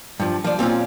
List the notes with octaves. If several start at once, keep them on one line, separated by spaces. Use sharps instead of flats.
G2 F3
F3 D5
A#2 C4 C#4 F4